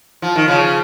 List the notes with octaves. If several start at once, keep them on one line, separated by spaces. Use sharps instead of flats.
F3
D#3
C#3 F3